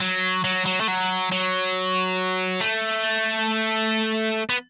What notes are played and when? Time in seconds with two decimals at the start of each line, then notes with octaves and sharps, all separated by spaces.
0.01 F#3
0.44 F#3
0.66 F#3
0.81 A3
0.88 F#3
1.32 F#3
2.60 A3
4.49 B3